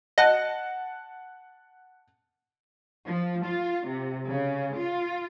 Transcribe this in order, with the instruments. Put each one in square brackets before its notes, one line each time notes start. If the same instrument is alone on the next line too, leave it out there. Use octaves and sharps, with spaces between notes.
[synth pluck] D#5 [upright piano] F#5 A5 F#6
[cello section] F3
F4
C3
C#3
F4